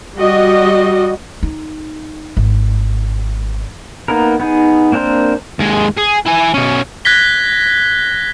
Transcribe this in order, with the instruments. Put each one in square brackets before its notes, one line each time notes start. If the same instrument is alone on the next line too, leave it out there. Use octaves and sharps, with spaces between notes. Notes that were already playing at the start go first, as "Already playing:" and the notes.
[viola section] G3 F#4 D#5
[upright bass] D#4
G#1
[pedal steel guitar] A#3 B3 D#4 A#4
B3 D#4 G#4
A#3 C4 D4 A#4 C5
[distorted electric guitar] D#2 G#3
G#4
E4 G#5
B2 C#4
[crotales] F#6 G#6 A#6 B6 G7